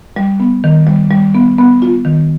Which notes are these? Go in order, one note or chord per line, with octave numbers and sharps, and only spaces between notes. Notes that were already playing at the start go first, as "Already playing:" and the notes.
G3
B3
D#3
G3
G3
B3
B3
F4
D#3